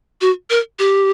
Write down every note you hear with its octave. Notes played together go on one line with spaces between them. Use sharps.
F#4
A#4
G4